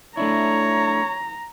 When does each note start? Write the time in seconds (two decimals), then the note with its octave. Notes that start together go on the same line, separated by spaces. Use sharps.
0.17 A3 D4 E4 C#5 A#5